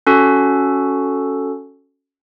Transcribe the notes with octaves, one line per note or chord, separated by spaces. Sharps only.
C#4 F#4 A4